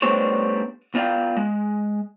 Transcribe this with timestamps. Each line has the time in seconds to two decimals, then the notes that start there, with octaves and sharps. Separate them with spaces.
0.02 G3 A3 B3 D4 C5 C#5
0.95 B3 F4 D5 D#5 F5 G5
1.37 G#3